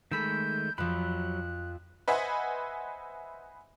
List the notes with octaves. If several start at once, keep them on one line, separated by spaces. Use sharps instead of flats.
D#3 G#3 A3 A4 B5 E6 G6
F2 F3 F#3 B5 F#6
B4 C5 D#5 E5 F#5 G#5